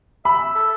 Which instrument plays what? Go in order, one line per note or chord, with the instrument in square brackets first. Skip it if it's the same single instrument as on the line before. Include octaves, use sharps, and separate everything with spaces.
[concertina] E5 [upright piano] B5
[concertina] E5
A4